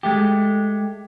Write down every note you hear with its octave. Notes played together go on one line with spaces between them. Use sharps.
G#3 A3 G4